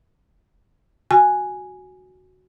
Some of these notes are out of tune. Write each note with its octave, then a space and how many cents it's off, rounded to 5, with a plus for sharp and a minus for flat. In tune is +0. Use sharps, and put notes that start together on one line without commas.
F#4 +0 G#5 +0